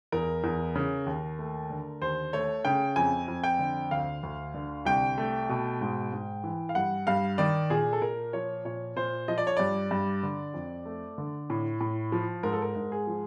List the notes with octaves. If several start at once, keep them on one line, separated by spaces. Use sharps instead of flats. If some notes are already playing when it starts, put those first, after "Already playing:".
E2 A#4
E2
C#3
D#2
A3
D3
D#2 C5
A3 C#5
C#3 G5
F2 G#5
F2
G5
D3
D2 F5
D2
D3
C2 G5
A3
B2
G#2
G#2
E3
F5
G2 F#5
G2 F5
D#3 D5
A#2 G#4
A4
A#2 A#4
F3 C#5
A#2 C#5
A#2 C5
F3 D#5
D5
C#5
G2 D5
G2
D3
F2
A3
D3
A2
A2
F3
G#2 A#4
A4
A#4
G#2
G#4
F3